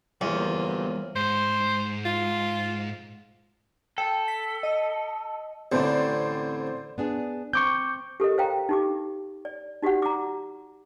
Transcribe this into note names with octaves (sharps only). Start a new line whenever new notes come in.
E2 G3 A#3 B3 F4 C5 C#5
G#2 C5
F4
A4 G5
B6
D#5
A1 D3 C4 C5 D5
B3 D4 G#4
C4 C#6 D6 G6
G4 A4 A#4 D#5
C5 F5 G5 A#5
D#4 G4 D6
D5
D#4 F#4 G4 D5 F#5
A#5 D6